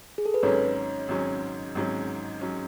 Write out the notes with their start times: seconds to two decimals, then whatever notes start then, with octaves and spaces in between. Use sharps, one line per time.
0.18 G#4
0.26 A4
0.34 B4
0.43 G#1 G#2 F#3 C#4 C#5
1.09 G#1 G#2 F#3 C#4
1.75 G#1 G#2 F#3 C#4
2.41 F#3 C#4